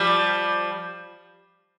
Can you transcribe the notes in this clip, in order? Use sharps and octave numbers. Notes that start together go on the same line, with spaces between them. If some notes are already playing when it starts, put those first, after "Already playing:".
Already playing: F3 G3